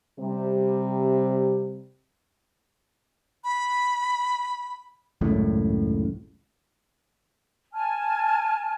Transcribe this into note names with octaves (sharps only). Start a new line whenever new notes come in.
C3 G3
B5
G#1 C#2 F#2 A2
G#5 A5 F6